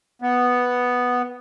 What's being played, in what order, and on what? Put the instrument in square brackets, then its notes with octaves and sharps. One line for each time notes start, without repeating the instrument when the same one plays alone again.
[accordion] B3